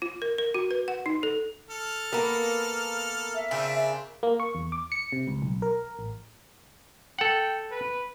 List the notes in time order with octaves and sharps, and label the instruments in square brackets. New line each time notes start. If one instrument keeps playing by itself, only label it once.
[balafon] F4
A#4
A#4
F#4
B4
F#5
D#4
A4
[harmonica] A4 F6
[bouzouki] A#3 B3 [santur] A#4
[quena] E5
[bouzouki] C#3 F4 [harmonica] C4 D4
[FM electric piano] A#3
C#6
E2
D6
C#7
C3
C#2
B1
A#4
A1
[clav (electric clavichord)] A4 F#5 [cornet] G5
[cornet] B4